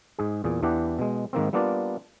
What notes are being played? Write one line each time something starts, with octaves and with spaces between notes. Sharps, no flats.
G#2 G#4
E2 A#2 G#4
E2 E3 D4 G4 F#5
B2 G#3
G#2 D#3 A#3 C4
G3 A#3 B3 D4 F4 D5